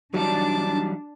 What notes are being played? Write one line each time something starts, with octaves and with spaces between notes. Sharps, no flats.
E3 F#3 G3 D4 D#4 A5 D6